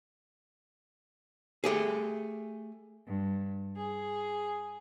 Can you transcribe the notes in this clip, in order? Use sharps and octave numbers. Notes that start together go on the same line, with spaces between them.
A3 G4 G#4
G2
G#4